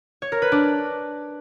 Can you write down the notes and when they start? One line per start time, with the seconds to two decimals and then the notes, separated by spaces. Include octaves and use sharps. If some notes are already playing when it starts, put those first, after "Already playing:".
0.22 C#5
0.32 A#4
0.42 B4
0.52 D4